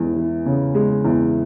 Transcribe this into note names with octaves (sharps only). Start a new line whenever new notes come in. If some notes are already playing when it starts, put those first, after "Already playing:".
Already playing: E2 G#3
E3
C#3
G#3
E2